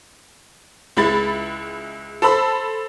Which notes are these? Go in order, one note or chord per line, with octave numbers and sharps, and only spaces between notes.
C#2 G#3 E4 B5 A6
A4 C5 A5 B5 E6